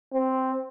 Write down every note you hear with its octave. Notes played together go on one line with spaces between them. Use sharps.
C4